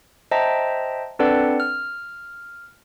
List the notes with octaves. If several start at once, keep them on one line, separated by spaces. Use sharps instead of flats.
C5 D#5 E5 G5 A5 A#5
C4 D4 A4 B4 D5 F#5
F6